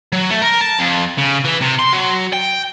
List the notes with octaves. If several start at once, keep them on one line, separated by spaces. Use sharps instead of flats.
F#3
A3
A#4
A5
F2
C#3
E3
C3
C6
F#3
G5